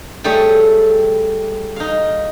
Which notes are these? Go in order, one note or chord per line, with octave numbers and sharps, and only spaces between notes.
G3 A3 G4 G#4 C#5
D#4 F5